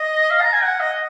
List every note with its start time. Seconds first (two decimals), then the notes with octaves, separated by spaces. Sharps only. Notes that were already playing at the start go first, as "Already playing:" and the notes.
Already playing: D#5
0.31 F5
0.42 A#5
0.52 G#5
0.63 F#5
0.80 D#5